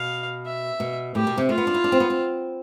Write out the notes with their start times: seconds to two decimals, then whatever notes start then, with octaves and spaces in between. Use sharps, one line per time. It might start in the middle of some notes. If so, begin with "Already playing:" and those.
Already playing: B2 F5
0.46 E5
0.80 B2
1.15 A2 G4
1.27 B2
1.38 C3
1.49 A3 F4
1.58 B3
1.67 D4
1.74 E4
1.84 D4
1.92 C4
2.00 B3
2.10 C4